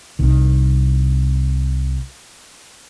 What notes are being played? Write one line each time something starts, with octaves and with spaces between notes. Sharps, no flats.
C2 D#3